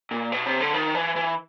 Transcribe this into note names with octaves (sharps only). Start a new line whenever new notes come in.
A#2
B2
C3
D3
D#3
E3
E3